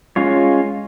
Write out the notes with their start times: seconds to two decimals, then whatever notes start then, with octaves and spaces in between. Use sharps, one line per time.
0.16 G#3 C#4 F4 C#5